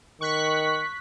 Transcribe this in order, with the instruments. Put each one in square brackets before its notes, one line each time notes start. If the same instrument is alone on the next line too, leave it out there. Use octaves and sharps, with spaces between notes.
[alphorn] D#3 [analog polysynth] C#6 F#6 B6